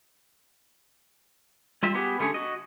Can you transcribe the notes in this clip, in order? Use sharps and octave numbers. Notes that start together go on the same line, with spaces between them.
G3 F4 E5
B3 G4 G#4 B4
D3 A3 C#4 G#4
F#4 D#5